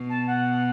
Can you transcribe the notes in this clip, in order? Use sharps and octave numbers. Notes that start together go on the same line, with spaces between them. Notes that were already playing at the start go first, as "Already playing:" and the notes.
Already playing: B2
A5
F#5